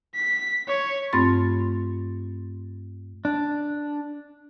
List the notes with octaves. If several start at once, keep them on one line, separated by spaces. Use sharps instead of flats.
B6
C#5
G2 A3 C4 F4 C6 A6
D4